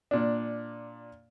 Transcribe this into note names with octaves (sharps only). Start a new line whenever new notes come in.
A#2 D4